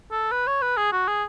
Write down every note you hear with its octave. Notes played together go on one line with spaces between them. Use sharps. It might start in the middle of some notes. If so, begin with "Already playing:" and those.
A4
B4
C#5
B4
G#4
F#4
G#4